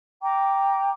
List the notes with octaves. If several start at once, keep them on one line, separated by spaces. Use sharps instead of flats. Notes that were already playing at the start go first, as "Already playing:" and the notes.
G5 A#5 D6